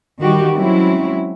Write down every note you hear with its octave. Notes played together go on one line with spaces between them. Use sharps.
D#3 E3 G3 F#4 G4
F#3 G#3 C4 C#4 E4